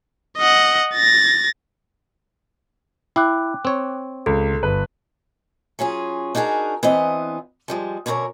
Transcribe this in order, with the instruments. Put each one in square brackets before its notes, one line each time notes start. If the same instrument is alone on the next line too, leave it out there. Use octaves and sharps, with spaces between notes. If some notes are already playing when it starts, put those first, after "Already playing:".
[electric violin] D#5 F#5
A6 A#6
[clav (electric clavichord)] E4 [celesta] G5 D6 F#6
[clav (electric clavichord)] C4 C#5
[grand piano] C#2 [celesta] A4
[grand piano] G1 B4
[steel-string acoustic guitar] F#3 C#4 F4 G#4
D4 D#4 F#4 G#4 A#4
E3 B3 C4 D4 D#5
F3 G3 G#3
F#2 B2 D3 E4 A#4 C#5